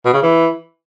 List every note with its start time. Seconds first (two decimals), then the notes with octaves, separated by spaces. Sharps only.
0.05 B2
0.13 C#3
0.23 E3